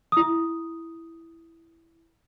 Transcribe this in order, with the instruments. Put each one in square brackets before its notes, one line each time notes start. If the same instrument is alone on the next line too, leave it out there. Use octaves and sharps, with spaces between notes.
[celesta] E4 D#6